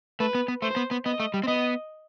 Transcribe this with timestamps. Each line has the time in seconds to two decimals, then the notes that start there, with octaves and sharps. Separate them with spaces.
0.20 A3 B4
0.35 B3
0.48 B3
0.62 A3 C5
0.76 B3
0.91 B3
1.05 B3 D#5
1.20 A3
1.34 G3
1.43 C4
1.47 B3 D#5